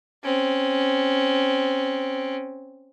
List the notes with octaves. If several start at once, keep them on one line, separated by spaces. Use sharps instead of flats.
C4 C#4